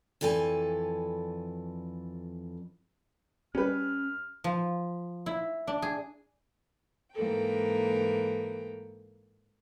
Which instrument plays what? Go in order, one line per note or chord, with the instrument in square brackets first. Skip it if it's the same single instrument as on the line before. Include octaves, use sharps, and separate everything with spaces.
[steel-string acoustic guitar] F2 E3 A4 D5 G#5
[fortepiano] G3 B4 [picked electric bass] C#4 [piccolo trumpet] F6
[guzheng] F3
E4
D4
G#4
[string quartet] G#2 E3 A#3 A4 A#4 G5